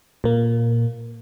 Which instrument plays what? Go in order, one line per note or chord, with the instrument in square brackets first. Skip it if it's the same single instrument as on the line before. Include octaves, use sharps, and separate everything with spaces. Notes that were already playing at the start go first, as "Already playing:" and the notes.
[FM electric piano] A#2 A#3